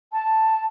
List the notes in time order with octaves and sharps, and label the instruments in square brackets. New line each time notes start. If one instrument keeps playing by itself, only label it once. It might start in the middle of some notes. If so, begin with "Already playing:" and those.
[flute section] A5